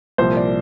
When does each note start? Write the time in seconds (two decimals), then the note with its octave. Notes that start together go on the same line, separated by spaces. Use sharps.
0.18 C2 A#2 F3 C5
0.37 D5